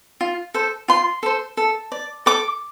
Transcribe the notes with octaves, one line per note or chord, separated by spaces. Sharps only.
F4
A4 C5
F4 C6
A4 C5
A4
D5
A4 D6